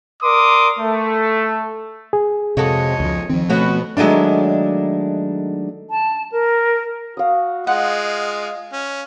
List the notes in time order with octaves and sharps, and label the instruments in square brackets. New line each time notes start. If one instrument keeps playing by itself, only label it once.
[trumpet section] A#4 D5 C6 D6 D#6
A3
[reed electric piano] G#4
[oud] F2 F#4 A4 [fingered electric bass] C3 [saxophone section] G#3 C#5 D#5
[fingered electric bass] C#2 F3
[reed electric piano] D#3 [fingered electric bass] F3 C4
[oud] B2 B3 C#4 [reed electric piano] A3 [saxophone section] F#4
[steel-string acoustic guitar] D#3 F#3 G#3 A3 D4
[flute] A5
A#4
[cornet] F#4 [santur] F5 D#6
[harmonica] G#3 F4 [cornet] D#5 [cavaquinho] F#5
[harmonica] C#4